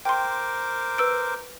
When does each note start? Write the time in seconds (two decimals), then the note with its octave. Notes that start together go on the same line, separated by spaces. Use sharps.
0.05 A#4 C5 G5 C6 D6
0.98 B4 E6 D7